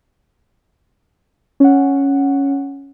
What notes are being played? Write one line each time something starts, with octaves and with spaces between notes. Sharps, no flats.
C#4 F#5